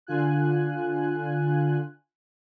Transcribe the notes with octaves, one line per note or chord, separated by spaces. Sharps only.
D3 F4 G#5 F#6